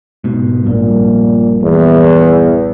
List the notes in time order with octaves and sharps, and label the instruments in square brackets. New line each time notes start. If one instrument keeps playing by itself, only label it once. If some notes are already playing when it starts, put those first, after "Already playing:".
[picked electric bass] G#2 B2
[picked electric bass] A#1 G2 [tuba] A#2
[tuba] E2